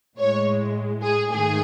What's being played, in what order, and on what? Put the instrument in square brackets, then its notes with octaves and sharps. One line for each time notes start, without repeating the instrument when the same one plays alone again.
[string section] A2 G#3 C#5
G#4
G#2 D#3 A3 G#4